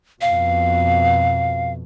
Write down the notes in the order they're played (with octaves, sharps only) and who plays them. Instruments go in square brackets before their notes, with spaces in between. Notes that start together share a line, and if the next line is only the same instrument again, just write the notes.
[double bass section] F2 B2 [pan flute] F5